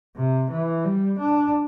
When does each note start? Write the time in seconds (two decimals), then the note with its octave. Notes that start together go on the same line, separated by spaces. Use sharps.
0.16 C3
0.51 E3
0.85 G3
1.19 D4